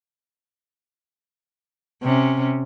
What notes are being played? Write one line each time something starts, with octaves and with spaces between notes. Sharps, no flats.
C3 C#4